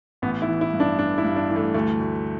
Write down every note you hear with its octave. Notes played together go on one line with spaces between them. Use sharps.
A1 B3
E4
E3
E4
G2
D4
E3 D4
E4
G2
D4
E3
A3
D2 A3
D2